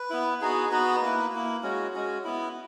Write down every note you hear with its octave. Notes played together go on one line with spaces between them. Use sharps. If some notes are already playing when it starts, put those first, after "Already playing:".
Already playing: B4
B3 E4
B3 D#4 F#4 G#4
B3 D#4 F#4 B4
A#3 E4
A#3 E4
G#3 C#4 F#4
G#3 C#4 F#4
B3 E4